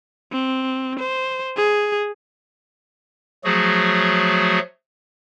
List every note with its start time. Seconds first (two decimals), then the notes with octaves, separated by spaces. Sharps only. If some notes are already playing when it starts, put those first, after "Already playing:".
0.32 C4
0.99 C5
1.57 G#4
3.44 F3 F#3 A3 F#4 G#4